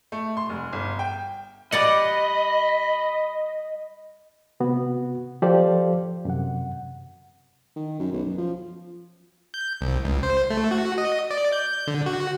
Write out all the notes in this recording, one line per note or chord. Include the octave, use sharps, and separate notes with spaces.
A3
C6
F1
G1
G5
G3 D5 D#5 F#5 B5
C3 B3 F#4
F3 G4 A4 C5 D5 F5
F#2 C3 F#5
D#3
F#2
B1
F#2
F3
G6
C2
C#2
C5
A3
F#4
D#5
D5
G6
D3
F#4